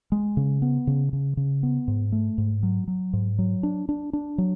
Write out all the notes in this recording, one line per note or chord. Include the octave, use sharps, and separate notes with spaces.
G#3
C#3
B3
C#3
C#3
C#3
B3
G#2
A3
G#2
F#3
F#3
G#2
F#3
D4
D4
D4
F#3